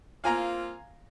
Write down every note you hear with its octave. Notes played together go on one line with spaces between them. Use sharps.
A#3 C4 F4 F5 G#5 A#5